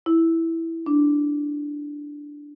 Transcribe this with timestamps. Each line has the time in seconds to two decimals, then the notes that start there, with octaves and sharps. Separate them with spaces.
0.06 E4
0.86 D4